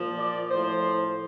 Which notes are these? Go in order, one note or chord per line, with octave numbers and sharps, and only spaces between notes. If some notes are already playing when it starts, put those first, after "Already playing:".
Already playing: A#2 F3
D5
A2 F3 C5